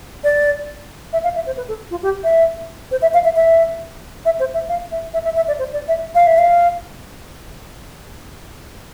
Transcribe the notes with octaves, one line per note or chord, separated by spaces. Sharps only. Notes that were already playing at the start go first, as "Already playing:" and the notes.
D5
E5
F5
E5
C5
B4
A4
F4
G4
E5
C5
E5
F5
E5
E5
E5
C5
E5
F5
E5
E5
E5
E5
D5
C5
D5
E5
F5
E5
F5